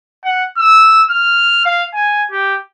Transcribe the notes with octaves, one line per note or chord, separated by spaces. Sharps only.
F#5
E6
F6
F5
G#5
G4